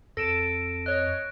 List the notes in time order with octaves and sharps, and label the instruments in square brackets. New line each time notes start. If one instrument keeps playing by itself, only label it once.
[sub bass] F2 [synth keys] A4 [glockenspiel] A#6 D7 E7
[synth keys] C#5 D#5 [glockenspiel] F#6